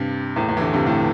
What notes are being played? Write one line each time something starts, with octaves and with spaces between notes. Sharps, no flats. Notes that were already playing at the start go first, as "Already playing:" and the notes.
Already playing: G2 C3
E2 A2
E2 A2
E3
A2 D3
G2 C3
A2 D3